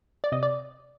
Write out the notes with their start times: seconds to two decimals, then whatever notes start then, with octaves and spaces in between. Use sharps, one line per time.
0.24 D5
0.32 C3 D#5
0.43 D5